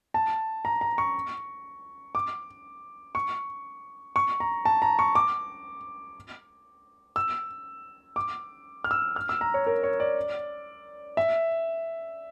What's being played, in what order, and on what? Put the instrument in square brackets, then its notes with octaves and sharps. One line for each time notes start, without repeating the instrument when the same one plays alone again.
[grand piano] A5
A#5
A#5
C#6
D6
C#6
C#6
A#5
A5
A#5
C#6
D6
E6
D6
F6
E6
F6
E6
A#5
C#5
A#4
C#5
D5
E5